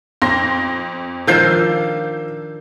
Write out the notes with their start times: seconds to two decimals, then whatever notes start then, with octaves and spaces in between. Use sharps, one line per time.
0.22 F2 C6 A#6
1.27 D#3 F3 D4 E6 G6 C7